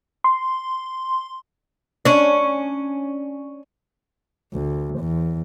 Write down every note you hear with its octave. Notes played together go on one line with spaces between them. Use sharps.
C6
C#4 D4
D2
E2